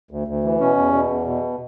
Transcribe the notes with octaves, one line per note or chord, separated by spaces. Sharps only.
D2
D2
E3
B2 C#4
E2
B2
E2
B2